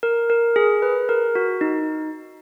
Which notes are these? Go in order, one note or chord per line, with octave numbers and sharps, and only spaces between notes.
A#4
A#4
G#4
B4
A#4
F#4
D#4